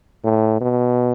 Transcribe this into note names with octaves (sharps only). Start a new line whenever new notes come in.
A2
B2